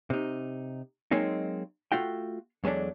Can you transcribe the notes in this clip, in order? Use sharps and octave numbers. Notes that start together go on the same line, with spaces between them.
C3 D#4
F#3 G#3 A#3 C4 D#4
A3 F4 F#4 G5
E2 F#3 G#3 A3 D4